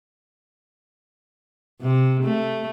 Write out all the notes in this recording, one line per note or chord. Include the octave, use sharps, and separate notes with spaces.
C3
A3